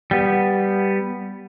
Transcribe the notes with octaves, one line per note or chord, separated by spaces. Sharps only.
G3 B3